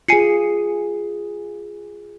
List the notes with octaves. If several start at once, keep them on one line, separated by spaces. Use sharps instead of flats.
F4 G#4 G#5 C7 C#7